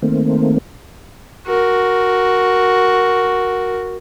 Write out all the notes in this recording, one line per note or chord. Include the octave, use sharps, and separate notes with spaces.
D#3 A3 A#3 C4
F#4 A#4